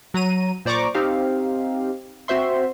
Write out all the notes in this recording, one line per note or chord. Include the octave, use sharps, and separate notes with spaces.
F#3 A#5 D#7
A#2 C5 D5 A#5 C#6 D6
C4 D#4 G4 F5
C4 F#4 C5 E5 C6